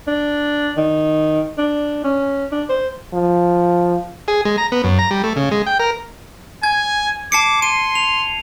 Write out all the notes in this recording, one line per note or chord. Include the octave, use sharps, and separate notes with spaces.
D4
D#3
D4
C#4
D4
C5
F3
G#4
G#3
A#5
B3
F#2
A#5
G3
A3
C#3
G#3
G5
A#4
G#5 G#6
A5 D6 C7 C#7
C6 D#7
F7